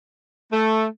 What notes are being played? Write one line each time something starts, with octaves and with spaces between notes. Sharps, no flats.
A3